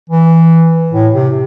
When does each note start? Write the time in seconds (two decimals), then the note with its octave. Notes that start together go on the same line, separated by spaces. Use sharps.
0.10 E3
0.93 A2
1.14 C3